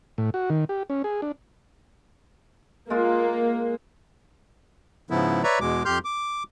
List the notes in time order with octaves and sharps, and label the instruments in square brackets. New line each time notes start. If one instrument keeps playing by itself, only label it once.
[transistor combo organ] A2
F#4
D#3
G4
C#4
G#4
D4
[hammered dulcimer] G#3 F4 [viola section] A#3
[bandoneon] G#2 C#3 F3 B3 E4
B4 C#5 D5 E5 A#5
E2 B2 G#3 D6
F2 G4 C6 F6 G6
D6